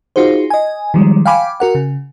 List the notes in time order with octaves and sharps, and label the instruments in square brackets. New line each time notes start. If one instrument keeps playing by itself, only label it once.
[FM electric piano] D#4 F4 F#4 G#4 C5
D#5 G#5
D#3 F3 G3 G#3
F5 G5 G#5 B5 D6
F#4 A#4 F#5
C#3